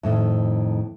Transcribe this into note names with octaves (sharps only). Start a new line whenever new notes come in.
F2 A2 D#3